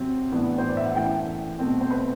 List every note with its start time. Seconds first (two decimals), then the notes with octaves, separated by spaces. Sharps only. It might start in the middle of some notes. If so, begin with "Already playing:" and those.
Already playing: C3 F#3 C4
0.32 A2 E3 B3 D4
0.58 C5
0.68 D5
0.77 E5
0.86 F#5
0.95 F#2 E3 A3 G5
1.59 B2 A3 C4
1.81 C5
1.91 B4